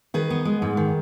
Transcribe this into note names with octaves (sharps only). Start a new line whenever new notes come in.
D#3 G#4 B4
B3
G#3
G#2
D#3